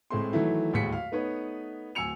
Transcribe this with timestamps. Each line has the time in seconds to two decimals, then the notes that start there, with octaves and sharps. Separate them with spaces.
0.10 A2 G#3 A3 C4 C6
0.33 D#3 E3 F#3 A3 E4
0.73 D1 D#2 A2 G#3 B6 C#7
0.92 F5
1.12 A3 B3 D#4 B4 C#5
1.95 D1 G#5 E6 C#7 F7